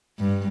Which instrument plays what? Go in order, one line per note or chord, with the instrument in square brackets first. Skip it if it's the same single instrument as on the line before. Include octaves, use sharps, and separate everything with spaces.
[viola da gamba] G2